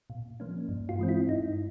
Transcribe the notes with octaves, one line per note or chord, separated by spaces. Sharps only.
A#2
F3 A#3 C#4
G2
F4
E3 G#3 C4
E4
G2 D#4